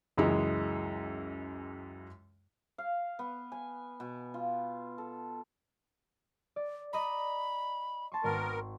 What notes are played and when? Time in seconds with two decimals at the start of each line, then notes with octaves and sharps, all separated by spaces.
0.17 C#2 F#2 E3 G#3
2.78 F5
3.19 B3
3.52 G#5
4.00 B2
4.34 F4
4.98 A4
6.56 D5
6.93 D5 D#5 A#5 B5
8.12 A5 C6 C#6
8.24 G#1 B3 A#4